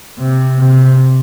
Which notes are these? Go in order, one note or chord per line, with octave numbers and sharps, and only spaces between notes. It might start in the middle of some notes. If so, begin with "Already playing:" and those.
C3
C3